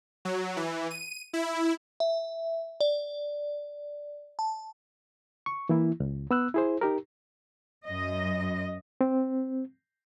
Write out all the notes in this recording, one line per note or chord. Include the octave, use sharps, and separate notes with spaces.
F#3
E3
D#7
E4
E5
D5
A5
C#6
E3 A#3 E4
C#2
B3 E6 F#6
E4 G#4 C5
D#4 G4 A#4
F#2 D#5
C4